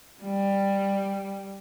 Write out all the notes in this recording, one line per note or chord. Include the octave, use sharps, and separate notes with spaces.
G3